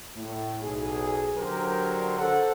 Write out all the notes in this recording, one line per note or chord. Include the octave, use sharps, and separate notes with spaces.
A2
B1 G#4
D3 F#3 D4 G4 A#4 C5
A4 C5 F#5